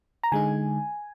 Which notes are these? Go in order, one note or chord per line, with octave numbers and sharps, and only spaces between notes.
A#5
D3 G#3 D#4 G#5